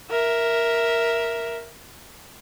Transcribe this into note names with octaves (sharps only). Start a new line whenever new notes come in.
A#4 E5